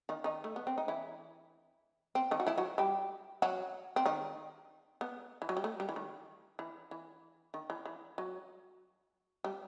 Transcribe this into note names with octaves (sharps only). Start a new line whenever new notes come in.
D#3 D#4
D#3 D#4
A3
B3
C4
D#4
E3 E4
C4
D#3 D#4
F#4
E3 E4
F#3 F#4
G3 G4
F#3 F#4
C4
D#3 D#4
B3
E3
F#3
G3
A3
G3
E3
D#3
E3
E3
D#3
E3
E3
F#3
G3